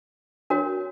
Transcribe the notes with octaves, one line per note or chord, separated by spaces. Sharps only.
D4 F#4 A#4 C#5